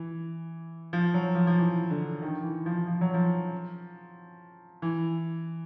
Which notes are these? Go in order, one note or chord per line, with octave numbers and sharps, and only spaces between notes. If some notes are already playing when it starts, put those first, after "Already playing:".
Already playing: E3
F3
F#3
F3
F3
E3
D3
D#3
E3
F3
F3
F#3
F3
E3